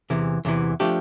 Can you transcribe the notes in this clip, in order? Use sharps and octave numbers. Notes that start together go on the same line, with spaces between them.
E2 C3 E3
E2 C3 E3
F3 A3 D4 G4